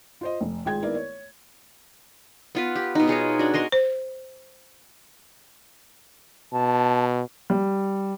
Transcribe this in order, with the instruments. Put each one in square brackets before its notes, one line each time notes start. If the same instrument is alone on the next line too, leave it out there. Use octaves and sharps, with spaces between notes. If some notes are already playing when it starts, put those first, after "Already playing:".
[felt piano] F4 C5 D#5
F1
G#1 F4 G#4 G5 G#6
D#3 A#3 B3 E4 A#4 D5
C#5
[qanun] B3 F4 B4
G4
B2 D#4
F4 G#4 C#5 D#5
D4 F#4
A#4 D#5 C6 C#6
[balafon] C5
[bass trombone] B2 [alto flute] A5
[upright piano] G3